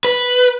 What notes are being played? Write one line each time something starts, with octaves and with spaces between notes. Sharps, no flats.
B4